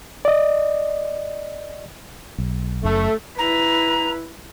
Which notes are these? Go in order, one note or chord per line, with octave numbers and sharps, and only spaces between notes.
D5 D#5
B1
F#1 F#2 A3
E4 B4 A#5